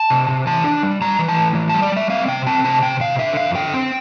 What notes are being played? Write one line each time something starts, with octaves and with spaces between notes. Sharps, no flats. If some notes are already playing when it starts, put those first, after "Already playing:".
Already playing: A5
C3
C3
E3 A5
D4
G3
G3 A#5
E3
A5
A2
E3
A5
G3
D5
G3 E5
C4 F5
C3 G5
C4 A5
C3 A5
C3 G5
C3 F5
D3 E5
F2 F5
D3 G5
C4